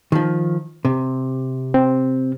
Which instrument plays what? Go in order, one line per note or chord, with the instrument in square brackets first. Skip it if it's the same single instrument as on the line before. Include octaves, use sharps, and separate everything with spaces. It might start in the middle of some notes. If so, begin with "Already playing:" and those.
[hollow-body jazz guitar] D#3 F3
C3
[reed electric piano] C4